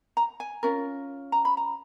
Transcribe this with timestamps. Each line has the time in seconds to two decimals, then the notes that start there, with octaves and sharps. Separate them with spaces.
0.17 A#5
0.40 G#5
0.63 C#4 F4 A#4
1.32 A#5
1.45 B5
1.57 A#5